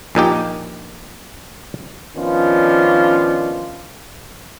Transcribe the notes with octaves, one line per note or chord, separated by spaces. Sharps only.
A#1 A#2 D#4 G4
D#3 F3 B3 C#4 D4 F4